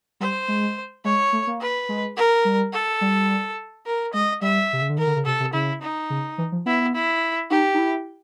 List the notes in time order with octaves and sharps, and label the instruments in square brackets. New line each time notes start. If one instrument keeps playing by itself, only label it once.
[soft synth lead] G3 [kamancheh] C5
[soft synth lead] G#3
[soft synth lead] G#3 [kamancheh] C#5
[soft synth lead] A3
A#3
[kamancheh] B4
[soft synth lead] G#3
[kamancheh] A#4
[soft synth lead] G3
[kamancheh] A4
[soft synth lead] G3
[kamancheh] A#4
[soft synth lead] G#3 [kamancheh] D#5
[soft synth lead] G3 [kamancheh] E5
[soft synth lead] C3
C#3
D3
[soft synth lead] D#3 [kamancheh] A#4
[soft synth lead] D3
C#3
[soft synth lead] C3 [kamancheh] A4
[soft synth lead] C3
[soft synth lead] C#3 [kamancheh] E4
[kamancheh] D#4
[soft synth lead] C#3
E3
F3
[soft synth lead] B3 [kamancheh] E4
[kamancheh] E4
[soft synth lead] D#4 [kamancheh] G4
[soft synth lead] D#4
E4